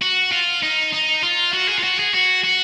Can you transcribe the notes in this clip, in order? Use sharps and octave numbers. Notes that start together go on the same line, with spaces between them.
F#4
F4
D#4
D#4
F4
F#4
G#4
F4
F#4
G#4
F#4
F#4